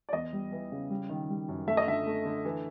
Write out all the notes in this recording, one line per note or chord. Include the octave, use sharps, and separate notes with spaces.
D5
E2 D#5
G3
E3
C#3
G3
D#3
G3
F#2
A3 E5
D#5
D3 E5
A3
D3
E3